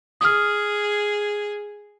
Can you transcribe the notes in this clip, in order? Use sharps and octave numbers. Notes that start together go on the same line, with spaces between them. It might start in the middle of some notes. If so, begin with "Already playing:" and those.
G#4 D#6 F6